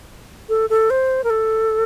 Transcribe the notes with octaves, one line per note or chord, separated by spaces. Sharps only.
A4
A4
C5
A#4
A4